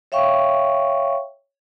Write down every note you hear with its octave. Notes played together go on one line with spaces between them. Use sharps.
C#5 E5 F5 G5 C#6